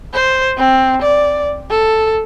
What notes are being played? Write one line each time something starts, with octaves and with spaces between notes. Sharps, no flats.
C5
C4
D5
A4